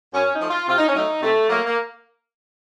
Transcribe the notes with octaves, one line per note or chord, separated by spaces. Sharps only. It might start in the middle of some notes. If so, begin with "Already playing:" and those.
F#2 C#4
D#4
F3 A3
F4
C3 F4
D#4
C#4
F#3 A3 D#4
C3 A3
F#3 A3 A#3
A#3